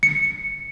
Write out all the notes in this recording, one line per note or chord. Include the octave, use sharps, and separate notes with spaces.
C#7